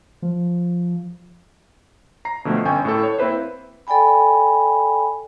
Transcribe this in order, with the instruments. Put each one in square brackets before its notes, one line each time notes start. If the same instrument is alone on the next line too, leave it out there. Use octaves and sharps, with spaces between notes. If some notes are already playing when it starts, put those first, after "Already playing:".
[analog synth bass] F3
[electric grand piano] A#5 C7
B2 D3 F3 A3 C4
G1 C#4 G5 G#5 C#6 G6
A2 A4
C#5
A#3 C4 E4 B4 C5
[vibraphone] A4 D5 G5 G#5 B5